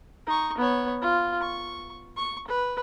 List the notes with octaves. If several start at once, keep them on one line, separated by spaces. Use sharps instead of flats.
D#4 C#6
B3 C#5
F4
C#6
C#6
B4